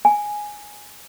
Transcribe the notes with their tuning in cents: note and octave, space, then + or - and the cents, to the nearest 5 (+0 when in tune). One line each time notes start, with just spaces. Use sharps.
G#5 +0